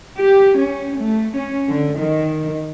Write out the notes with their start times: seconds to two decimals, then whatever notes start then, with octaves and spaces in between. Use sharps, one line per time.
0.18 G4
0.58 C#4
0.98 A3
1.36 C#4
1.69 D3
1.98 D#3